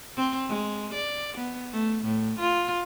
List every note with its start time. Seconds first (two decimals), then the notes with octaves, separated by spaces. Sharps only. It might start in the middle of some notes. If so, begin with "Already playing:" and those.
0.16 C4
0.49 G#3
0.94 D5
1.37 B3
1.72 A3
2.04 A2
2.39 F4